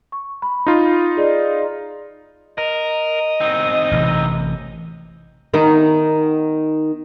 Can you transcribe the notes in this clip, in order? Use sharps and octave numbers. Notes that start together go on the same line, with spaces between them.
C#6
B5
D#4 F4
G#4 D5 D#5
A#4 D#5
C4 D#4
A1 C3 E3
D#3 B3 D#4